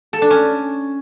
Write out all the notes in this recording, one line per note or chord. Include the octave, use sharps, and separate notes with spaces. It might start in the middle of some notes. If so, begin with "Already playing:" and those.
A4
D4
C#4